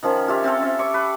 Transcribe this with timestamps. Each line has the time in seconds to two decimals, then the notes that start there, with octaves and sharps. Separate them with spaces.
0.03 D#3 F3 C#4 F4
0.28 F4 G4 E5
0.44 C4 F4 A4
0.60 C#4 E5
0.79 C#6 D6
0.94 B4